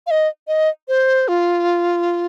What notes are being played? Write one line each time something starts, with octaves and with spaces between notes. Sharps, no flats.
F5
D#5
D#5
C5
F4